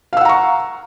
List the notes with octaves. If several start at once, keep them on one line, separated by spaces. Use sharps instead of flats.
F5 F#5 A#5 C#6 E6